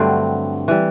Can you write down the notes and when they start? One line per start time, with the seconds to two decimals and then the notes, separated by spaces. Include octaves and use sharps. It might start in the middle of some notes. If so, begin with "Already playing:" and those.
Already playing: G2 D3 F#3 A3 C4
0.68 E3 G3